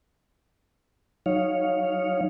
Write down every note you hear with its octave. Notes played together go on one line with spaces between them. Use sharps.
F#3 D#4 C#5 F5